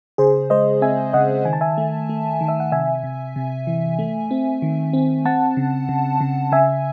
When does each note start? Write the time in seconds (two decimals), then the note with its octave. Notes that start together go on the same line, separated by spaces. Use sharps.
0.18 C#3 G#4 C5
0.50 G#3 C5 D#5
0.82 C4 E5 G#5
1.13 C#3 D#5 F#5
1.45 D#3 G#5
1.53 A5
1.61 E5 G#5
1.78 A3
2.09 A3
2.41 D#3
2.48 E5
2.60 F#5
2.72 C3 E5 G#5
3.03 C3
3.36 C3
3.67 E3
3.99 A3
4.31 C4
4.62 D#3
4.93 C4
5.25 C4 F#5 A5
5.57 C#3
5.89 C#3
6.21 C#3
6.52 C#3 E5 G#5